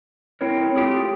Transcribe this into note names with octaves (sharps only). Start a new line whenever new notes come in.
C4 E4 A#4 C#5
A3 F4 G4 G#4